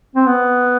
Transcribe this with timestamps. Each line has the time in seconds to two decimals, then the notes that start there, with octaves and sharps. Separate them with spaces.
0.16 C4
0.26 B3